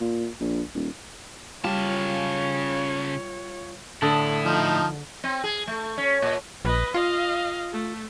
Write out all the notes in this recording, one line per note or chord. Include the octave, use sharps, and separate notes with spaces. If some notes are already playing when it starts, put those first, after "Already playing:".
A#2
A#1
D#1
C#3 G3 F4 C#5 F5 A5
A2 D3 E4 A5 D#6
F3 D#4
C4
G#4
A3
C#4
A#2
A#1 B4 D#5
F4 D#5 F5
A3